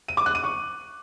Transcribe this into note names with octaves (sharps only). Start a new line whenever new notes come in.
D#7
D6
F#6
D#7
C#6